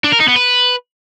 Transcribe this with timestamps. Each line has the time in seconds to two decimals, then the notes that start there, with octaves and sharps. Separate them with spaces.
0.04 D4
0.12 A#4
0.20 D#4
0.28 B3
0.36 B4